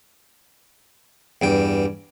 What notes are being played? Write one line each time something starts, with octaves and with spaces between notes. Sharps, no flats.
E2 G2 G5